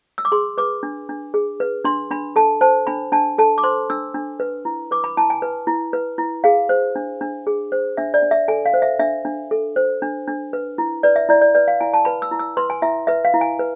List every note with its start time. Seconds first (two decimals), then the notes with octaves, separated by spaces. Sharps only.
0.18 E6
0.25 D6
0.32 G#4 C6
0.58 B4 D6
0.83 D4
1.09 D4
1.34 G#4
1.60 B4
1.84 D4 C6
2.11 D4 B5
2.36 A4 A5
2.61 C5 A5
2.87 D4 B5
3.12 D4 A5
3.38 A4 A5
3.58 D6
3.63 C5 C6
3.90 D4 E6
4.14 D4
4.40 B4
4.65 E4
4.91 B4 D6
5.04 B5
5.17 E4 A5
5.30 G#5
5.42 B4
5.67 E4
5.93 B4
6.18 E4
6.44 G#4 F5
6.69 C5
6.96 D4
7.21 D4
7.47 G#4
7.72 C5
7.97 D4 E5
8.14 D5
8.22 D4
8.31 E5
8.48 A4 G#5
8.66 F5
8.74 C5
8.82 E5
8.99 D4 E5
9.25 D4
9.51 A4
9.76 C5
10.02 D4
10.28 D4
10.53 B4
10.78 E4
11.03 B4 D5
11.16 E5
11.29 E4 D5
11.42 D5
11.55 B4 D5
11.68 F5
11.81 E4 G#5
11.94 A5
12.05 B4 B5
12.22 E6
12.31 E4
12.39 E6
12.57 B4 C6
12.70 G#5
12.82 E4 E5
13.07 B4 E5
13.25 F5
13.34 E4
13.41 G#5
13.59 B4